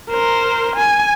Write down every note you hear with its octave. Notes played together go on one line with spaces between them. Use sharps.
A#4 C5
G#5